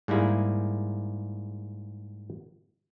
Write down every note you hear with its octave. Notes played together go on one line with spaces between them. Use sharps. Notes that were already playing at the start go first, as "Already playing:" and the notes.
G#2 G3 A#3 E4 G#4